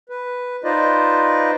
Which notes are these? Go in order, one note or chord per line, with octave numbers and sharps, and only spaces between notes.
B4
D#4 F4 B4 C5 D5 D#5